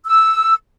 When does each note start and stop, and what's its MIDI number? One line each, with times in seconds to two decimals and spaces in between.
0.06 0.53 88